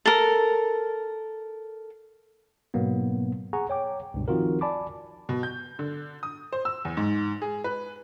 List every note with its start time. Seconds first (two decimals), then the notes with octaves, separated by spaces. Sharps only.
0.06 A4 A#4
2.74 G#2 B2 F#3 A#3 B3
3.53 G#4 F#5 G#5 A#5 C#6
3.70 C#5 G5 D6
4.14 C#2 G2 B2
4.28 D#3 F3 C4 F4 F#4 A#4
4.61 D5 G#5 A5 B5 D6
5.29 B2
5.43 G6
5.79 D3
6.23 D#6
6.53 C5
6.65 E6
6.85 E2
6.97 G#2
7.42 G#4
7.64 B4